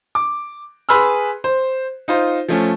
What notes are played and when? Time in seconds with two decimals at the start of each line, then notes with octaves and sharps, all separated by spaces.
0.15 D6
0.89 G#4 B4 B5 C6 E6 F6
1.44 C5
2.08 D#4 F4 C5
2.48 F3 A3 C#4